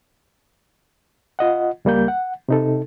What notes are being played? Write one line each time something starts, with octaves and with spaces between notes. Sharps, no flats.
F4 D#5 F#5
C#2 G3 A#3 G6
F#5
C3 D#4 A4